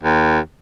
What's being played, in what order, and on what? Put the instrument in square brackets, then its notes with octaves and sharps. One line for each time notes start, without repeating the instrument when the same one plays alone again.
[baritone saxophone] D#2